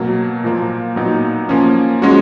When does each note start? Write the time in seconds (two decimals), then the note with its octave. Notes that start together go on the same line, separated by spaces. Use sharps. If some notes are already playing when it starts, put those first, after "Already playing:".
Already playing: B2 F#3 A#3
0.44 A#2 F3 A#3
0.96 A#2 F#3 B3 D#4
1.49 F3 A#3 C#4
2.02 F3 G#3 C#4 F#4